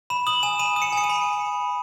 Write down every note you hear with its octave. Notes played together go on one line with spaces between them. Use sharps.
B5 E7
D#6 F#7
G#5 E7
B5 D#7
D#6
C#7
G#5 C#7
D#7
B5